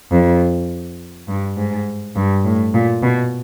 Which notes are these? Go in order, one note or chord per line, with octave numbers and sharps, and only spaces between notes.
F2
G2
G#2
G2
A2
A#2
B2